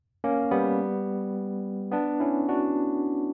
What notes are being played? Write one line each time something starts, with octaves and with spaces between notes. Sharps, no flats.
A#3 C#4
G3 B3
B3 D4
C#4 E4
D4 F#4